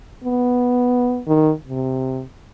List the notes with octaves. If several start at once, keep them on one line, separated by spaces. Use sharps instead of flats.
B3
D#3
C3